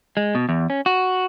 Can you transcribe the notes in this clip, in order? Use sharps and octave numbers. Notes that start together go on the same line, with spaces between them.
G#3
B2
E2
C#4
F#4